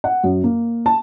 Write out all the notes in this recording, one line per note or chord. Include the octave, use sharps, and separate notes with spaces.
F#5
F#2
A#3
A5